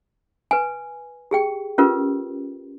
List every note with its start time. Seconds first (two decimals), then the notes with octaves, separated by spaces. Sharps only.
0.51 B4 G#5
1.31 G4 G#4 G5
1.78 C#4 F4 G4 A#4 B4